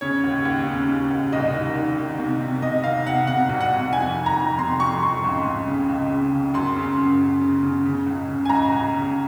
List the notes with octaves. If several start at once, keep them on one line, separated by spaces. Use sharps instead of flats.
C#3 C#5
D#2
D#2
C#3
C#3
D#2
C2 D#5
D#3
D#3
D#3
C3
C3
C3 D#5
D#3 F5
C3 F#5
C3 F#5
C2
F#5
C3
F2 G#5
D#3
A#5
F2
C3 C6
F2 C#6
F2 C6
C#2
C#2
C#3
C#2
C#3
C#3
F#2 C6
C#3
F#2
F#2
C#3
C#3
C#3
C#2
C#3
G#5
C#2 A#5
C#2
C#3